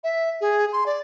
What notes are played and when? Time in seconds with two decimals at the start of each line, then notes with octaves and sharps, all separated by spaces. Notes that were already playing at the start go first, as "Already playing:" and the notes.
0.04 E5
0.41 G#4
0.73 C6
0.86 D5